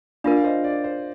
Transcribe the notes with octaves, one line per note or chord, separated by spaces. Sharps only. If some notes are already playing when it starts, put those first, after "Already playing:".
D4 F4 A#4 D5 F5
F5
C5 D#5
D5
C5